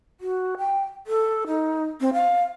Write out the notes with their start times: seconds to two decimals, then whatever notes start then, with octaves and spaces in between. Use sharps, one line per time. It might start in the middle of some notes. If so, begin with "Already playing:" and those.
0.21 F#4
0.58 G5
1.07 A4
1.47 D#4
2.01 C4
2.14 F5